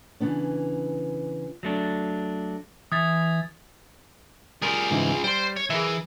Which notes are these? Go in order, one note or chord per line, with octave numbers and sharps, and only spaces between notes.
C#3 E3 B3 D4
F#3 A3 D4
E3 E5 D#6 G#6 A6
G3 F4 G#4 A#4
G#2 C#3 E3
G3 C5 G5 C6
C#5
E3 G#4 A#4 E5